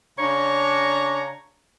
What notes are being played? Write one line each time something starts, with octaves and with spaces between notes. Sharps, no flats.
C#3 D4 C#5 A#5